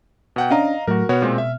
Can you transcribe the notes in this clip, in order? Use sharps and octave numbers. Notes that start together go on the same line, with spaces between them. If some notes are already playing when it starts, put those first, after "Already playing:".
B2 F#5 G5
C#4 D4 D#5 F5 A#5
A2 F#3 A3 F#4 A#4
B2 B3 F#4 C#5 F6
A#2 G#3 C4
E5